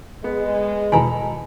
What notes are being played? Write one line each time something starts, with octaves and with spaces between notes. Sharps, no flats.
G#3 B3
E2 B2 D#3 A4 G#5 A#5 B5